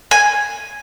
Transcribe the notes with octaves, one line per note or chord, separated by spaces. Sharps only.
G#5